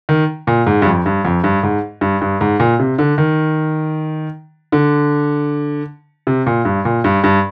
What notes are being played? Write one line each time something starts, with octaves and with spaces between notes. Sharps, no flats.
D#3
A#2
G#2
G2
F2
G2
F2
G2
G#2
G2
G2
G#2
A#2
C3
D3
D#3
D3
C3
A#2
G2
A#2
G2
G2